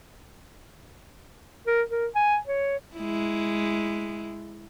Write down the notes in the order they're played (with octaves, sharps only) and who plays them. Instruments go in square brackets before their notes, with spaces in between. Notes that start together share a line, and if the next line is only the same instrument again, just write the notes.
[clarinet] A#4
A#4
G#5
C#5
[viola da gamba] G#3 E4